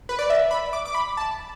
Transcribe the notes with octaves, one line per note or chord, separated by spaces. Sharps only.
B4
D5
E5
B5
D6
D6
B5
A5